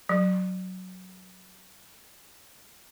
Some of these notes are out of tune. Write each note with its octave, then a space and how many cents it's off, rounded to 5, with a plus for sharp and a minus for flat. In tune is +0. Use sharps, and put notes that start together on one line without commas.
F#3 +0